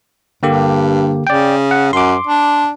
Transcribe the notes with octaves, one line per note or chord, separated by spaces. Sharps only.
G2 D3 A#3 G4
C#3 D5 G5
F#5
F#2 C6 D6
D4